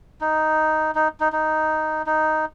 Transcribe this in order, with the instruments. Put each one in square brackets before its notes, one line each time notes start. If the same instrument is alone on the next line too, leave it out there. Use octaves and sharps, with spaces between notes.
[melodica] D#4
D#4
D#4
D#4
D#4